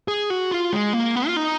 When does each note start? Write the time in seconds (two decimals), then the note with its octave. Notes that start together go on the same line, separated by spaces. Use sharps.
0.08 G#4
0.30 F#4
0.51 F4
0.73 G#3
0.93 A#3
1.15 B3
1.27 F4
1.37 D#4